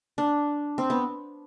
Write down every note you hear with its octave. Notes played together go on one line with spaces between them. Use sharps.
D4
C4
B3